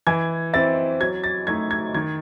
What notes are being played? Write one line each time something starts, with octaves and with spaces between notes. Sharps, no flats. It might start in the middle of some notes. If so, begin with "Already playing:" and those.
E3 G#6
C4 E4 A6
F#3 G#6
A6
A3 D#4 G#6
G#6
D#3 G#6